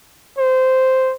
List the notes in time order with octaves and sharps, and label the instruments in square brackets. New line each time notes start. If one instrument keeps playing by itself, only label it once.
[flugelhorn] C5